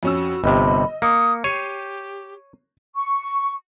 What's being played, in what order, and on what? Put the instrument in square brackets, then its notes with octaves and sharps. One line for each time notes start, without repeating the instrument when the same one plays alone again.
[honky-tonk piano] F2 C#4 E6 [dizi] F#4
[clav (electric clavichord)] G1 C3 [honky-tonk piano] D#5 [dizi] B5
[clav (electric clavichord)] A#3 [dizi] D#6 [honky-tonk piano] C#7
[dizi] G4 [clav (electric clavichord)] C#5 [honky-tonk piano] C7 D#7
[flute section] C#6